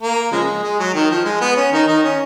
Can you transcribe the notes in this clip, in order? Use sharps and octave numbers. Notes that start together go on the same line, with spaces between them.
A#3
C#3 F3 G#3
G#3
F#3
D#3
F3
G#3
B3
C#4
D#3 D#4
D#3 D#4
C#4